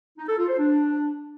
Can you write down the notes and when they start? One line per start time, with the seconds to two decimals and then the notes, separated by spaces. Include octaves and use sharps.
0.18 D#4
0.28 A4
0.38 F4
0.48 C5
0.58 D4